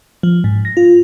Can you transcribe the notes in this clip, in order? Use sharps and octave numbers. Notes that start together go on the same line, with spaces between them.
F3
G#2
A#6
F4